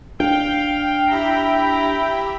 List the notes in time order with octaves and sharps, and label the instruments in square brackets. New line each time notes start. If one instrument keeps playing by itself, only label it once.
[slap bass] D4 [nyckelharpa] F5 [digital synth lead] G5
[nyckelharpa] E4 A#5 [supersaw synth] G4 E5 B5